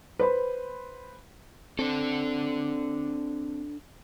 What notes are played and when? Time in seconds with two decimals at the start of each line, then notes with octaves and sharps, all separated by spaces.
0.19 B4 C5 B5
1.79 C4 D4 A4